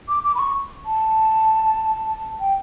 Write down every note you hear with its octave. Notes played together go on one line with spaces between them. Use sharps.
D6
D6
B5
C#6
A5
G5